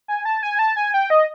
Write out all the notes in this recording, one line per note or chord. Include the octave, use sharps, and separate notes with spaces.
G#5
A5
G#5
A5
G#5
G5
D#5